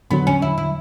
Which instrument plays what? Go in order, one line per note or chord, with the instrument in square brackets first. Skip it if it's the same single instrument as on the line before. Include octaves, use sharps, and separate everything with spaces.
[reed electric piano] E2 D3 F#3 [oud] B3
[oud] C#4
E4
E4